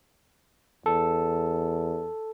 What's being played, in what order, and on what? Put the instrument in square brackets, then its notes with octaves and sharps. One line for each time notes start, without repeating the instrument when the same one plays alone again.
[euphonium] E2 [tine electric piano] A4